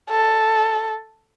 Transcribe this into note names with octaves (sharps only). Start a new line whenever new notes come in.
A4